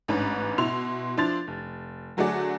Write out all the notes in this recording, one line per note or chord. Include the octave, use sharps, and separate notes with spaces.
A1 G#2 C#4 D4 B4
B2 E4 C6 F7
F3 D4 E4 C6 A6 F7
F1
D3 F#3 A3 F#4 G#4 D5